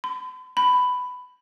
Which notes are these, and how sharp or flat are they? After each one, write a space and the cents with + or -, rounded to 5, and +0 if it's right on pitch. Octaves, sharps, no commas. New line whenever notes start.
B5 +45
B5 +10